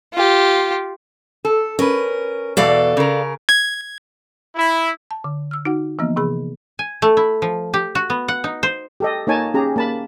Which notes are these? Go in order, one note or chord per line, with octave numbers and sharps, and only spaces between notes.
F4 G4
A4
C#4 A#4 B4
E2 B2 A4 D5 F5
C#3 A#4
G#6
E4
A5
D3
E6 F6
D#4 F#4 F#5
E3 F3 A#3 B3 D#5
C3 E3 G#4 B5
G#5
A3
E4
F3
G4
F#4
B3
F#5
D#4
C5
G4 A4 D#5
A#3 D#4 C#5 G#5 A5
C#4 G4 G#4 A#5
A#3 A5 B5